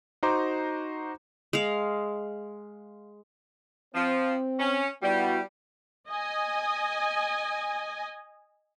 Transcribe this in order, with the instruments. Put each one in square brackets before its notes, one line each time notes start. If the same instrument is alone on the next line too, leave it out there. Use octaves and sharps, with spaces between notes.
[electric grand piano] D#4 F#4 C5 A#5 C6 D6
[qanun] G#3 F5
[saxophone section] F3 [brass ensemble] C4
[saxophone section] C#4
[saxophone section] G3 [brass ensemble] B3 E4 F#4
[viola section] D#5 G#5